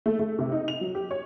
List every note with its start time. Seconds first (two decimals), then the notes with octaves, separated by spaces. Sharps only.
0.06 A3
0.19 A3
0.39 C3
0.52 D#4
0.68 F7
0.81 F#3
0.95 G4
1.11 C#5